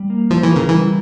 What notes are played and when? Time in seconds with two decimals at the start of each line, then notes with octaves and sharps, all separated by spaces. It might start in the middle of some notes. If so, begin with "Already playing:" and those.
Already playing: G3
0.10 A#3
0.31 F3 E4
0.43 E3
0.51 C#3 A#4
0.69 E3 G3